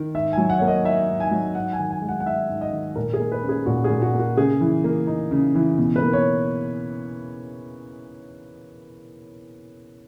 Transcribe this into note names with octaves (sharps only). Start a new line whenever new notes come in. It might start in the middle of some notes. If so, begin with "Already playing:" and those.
Already playing: D#3
G#2 E5
F#3 G#5
F#5
A#3 C#5
D#5
D#4 E5
G#2
G#5
F#3
G#2 F#5
G#5
D#3
G#5
G#3
F#5
F#5
D#4 E5
G#2
D#5
D#3
A#2 A#4
G#4
A#3
B4
C#4
G#4
A#2 F#4
G#4
A#2
F#4
A#3
F#4
C#3 G#4
E3
A#3
D#4
C#3
E3
B2
B4
A#3
C#5